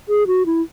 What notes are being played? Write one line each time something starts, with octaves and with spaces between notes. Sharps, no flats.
G#4
F#4
E4